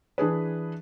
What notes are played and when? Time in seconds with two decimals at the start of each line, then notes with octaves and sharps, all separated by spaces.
0.18 E3 D4 G#4 B4